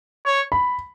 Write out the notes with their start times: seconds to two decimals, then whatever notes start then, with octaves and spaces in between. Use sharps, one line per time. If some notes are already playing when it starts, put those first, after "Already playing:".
0.26 C#5
0.52 B5